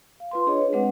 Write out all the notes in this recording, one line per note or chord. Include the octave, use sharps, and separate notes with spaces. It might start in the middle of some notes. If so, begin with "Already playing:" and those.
F5
F4 B4 C6
D4 G#4 C#5 D#5
B4
G#3 A3 C4 D4 B4 F#5